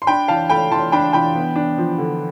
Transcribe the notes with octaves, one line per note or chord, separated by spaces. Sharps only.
C6
D4 G5 B5
E3 F5 A5
A3 G5 B5
E3 A5 C6
D4 G5 B5
E3 G5 B5
B3
D4
F3
D3